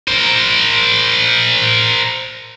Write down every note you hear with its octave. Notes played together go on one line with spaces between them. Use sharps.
A#4 C5